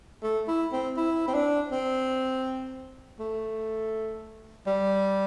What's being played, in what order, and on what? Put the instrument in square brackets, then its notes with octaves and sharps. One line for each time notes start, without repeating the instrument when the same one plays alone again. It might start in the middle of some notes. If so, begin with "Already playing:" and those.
[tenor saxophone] A3
E4
C4
E4
C4
D4
C4
A3
G3